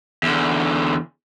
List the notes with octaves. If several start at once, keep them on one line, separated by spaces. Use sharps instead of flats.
E2 D3